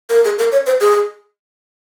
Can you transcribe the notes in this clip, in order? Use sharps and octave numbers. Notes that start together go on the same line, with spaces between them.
A#4
G#4
A#4
C#5
C5
G#4